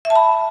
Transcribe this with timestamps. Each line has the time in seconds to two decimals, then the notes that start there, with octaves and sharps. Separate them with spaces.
0.05 E5
0.10 A5
0.15 B5